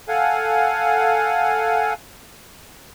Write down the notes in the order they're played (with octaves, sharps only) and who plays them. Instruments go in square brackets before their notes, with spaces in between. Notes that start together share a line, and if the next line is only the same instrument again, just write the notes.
[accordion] A4 F5 F#5 G#5